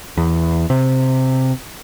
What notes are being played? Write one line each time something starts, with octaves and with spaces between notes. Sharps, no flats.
E2
C3